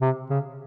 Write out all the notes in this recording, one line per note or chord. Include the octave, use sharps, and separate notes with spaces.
C3
C#3